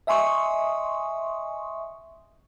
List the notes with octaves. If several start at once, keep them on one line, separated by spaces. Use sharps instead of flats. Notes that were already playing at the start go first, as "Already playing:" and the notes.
D#5 E5 G#5 C6 C#6 D#6